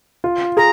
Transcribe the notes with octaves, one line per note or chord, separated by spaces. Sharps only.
F4
G#4 A#5